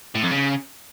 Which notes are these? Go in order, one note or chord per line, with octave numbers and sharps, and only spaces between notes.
A2
F2
C#3